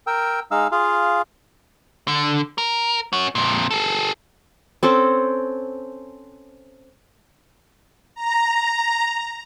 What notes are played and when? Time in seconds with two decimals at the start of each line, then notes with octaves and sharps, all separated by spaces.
0.07 A#4 G5 E6
0.51 G#3 D#4 F5 E6
0.72 F4 G#4 F5
2.08 D3
2.58 A#4
3.13 C#4 F#4
3.35 F2 A#2
3.71 G#4 A4
4.83 C4 C#4 A4 C5
8.15 A#5